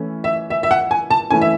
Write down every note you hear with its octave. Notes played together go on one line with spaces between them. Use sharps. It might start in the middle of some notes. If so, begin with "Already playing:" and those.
Already playing: E3 A3 C#4 E4
E5
E5
E5
F#5
G#5
A5
E3 A3 C#4 E4 G#5
E5